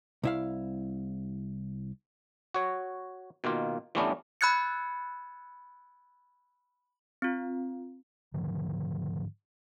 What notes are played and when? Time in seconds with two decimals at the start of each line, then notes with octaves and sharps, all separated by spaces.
0.23 C2 E4 F5
2.54 F#4 C#5
3.44 B2 D#3 A#3 F4
3.95 E3 G3 A3 B3 C#4 D4
4.41 B5 E6 F#6 G#6 A6 C#7
7.22 C4 F4
8.34 G#2 D3 D#3 F3